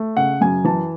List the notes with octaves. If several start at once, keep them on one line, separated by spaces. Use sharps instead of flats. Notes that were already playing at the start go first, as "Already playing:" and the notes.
Already playing: A3
C#3 F#5
F#2 G#5
E3 A5